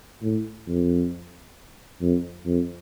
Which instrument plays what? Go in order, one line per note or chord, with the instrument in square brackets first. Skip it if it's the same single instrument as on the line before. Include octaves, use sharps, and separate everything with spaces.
[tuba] A2
F2
F2
F2